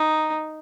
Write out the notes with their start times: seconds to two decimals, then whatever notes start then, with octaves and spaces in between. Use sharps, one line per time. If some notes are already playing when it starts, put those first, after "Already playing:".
Already playing: D#4